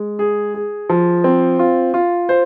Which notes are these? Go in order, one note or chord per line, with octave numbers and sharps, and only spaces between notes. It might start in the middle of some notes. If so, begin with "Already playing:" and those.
Already playing: G#3
G#4
G#4
F3
C4
F4
F4
C5